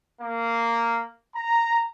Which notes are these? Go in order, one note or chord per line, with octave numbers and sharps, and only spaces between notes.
A#3
A#5